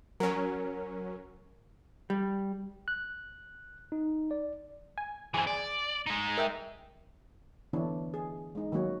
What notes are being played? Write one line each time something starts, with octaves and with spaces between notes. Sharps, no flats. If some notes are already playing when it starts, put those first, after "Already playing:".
F#3 C#4 A#4
G3
F#6
D#4
D5
G#5
E3 C4 G#4 G#5
D5
G#3 D#4
A#4 E5 G5
D3 E3 B3 D4 E4 C#5
G#4
G#3 D#4
D#3 F#3 A#3 F#4 C#5